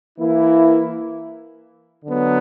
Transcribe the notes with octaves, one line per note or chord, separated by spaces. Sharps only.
E3 A#3 E4
D3 F#3 B3